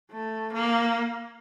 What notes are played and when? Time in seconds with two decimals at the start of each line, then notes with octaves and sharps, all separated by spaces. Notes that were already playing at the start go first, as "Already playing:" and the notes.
0.12 A3
0.53 A#3